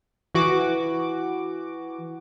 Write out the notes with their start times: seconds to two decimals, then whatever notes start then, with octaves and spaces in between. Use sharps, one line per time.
0.35 E3 F#4 D6